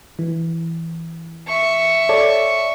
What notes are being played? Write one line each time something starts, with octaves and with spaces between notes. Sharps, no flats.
E3
E5 C#6
A4 C#5 D5